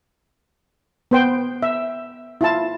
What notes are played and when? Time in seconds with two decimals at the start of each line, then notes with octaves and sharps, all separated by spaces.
1.11 B3 C5 G5
1.63 E5
2.41 E4 F4 A5